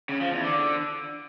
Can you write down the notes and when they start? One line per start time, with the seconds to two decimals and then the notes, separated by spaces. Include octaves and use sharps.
0.09 C#3
0.21 F3
0.32 E2
0.44 D3